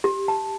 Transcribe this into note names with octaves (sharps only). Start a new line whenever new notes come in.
G4
A5